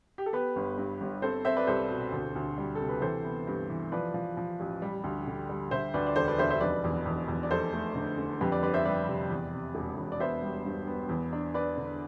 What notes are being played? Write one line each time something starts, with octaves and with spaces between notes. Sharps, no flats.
G4
A4
B3 G4 B4
G1
G2
G1
C4 A4 C5
C4 C5 E5
B4 D5
C2 A4 C5
B2
D2
D2
G3
C3 A4
B4
E3 A4 C5
B3
G2
E3
F3 B4 D5
F3
F3
A1
G3
D2
D3
G3
D3 C5 E5
D2 B4 D5
D5
E1 A4 C5
B4 D5
E1 C5 E5
C5 E5
F1 B4 D5
E2
E2
E2
D5
F1 A4 C5
A3
D3
D3
F2 G4 B4
B4 D5
G1 B4 D5
C5 E5
G3 B4 D5
C3
E2
C3
E1
E1
D5
B3 C5 E5
G3
G2
B3
E2
D4
D4 B4 D5
D3